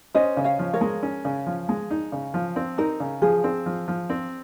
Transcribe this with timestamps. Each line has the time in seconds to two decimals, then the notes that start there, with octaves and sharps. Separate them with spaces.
0.14 C#4 C5 D#5
0.37 C#3
0.44 C#5 F5
0.59 F3
0.74 A#4 C#5
0.81 G#3
1.03 C#4
1.25 C#3
1.46 F3
1.69 G#3
1.91 D#4
2.12 C#3
2.34 F3
2.56 C4
2.78 D#4 A#4
3.00 C#3
3.22 F3 G#4
3.44 C4
3.66 F3
3.88 F3
4.10 C4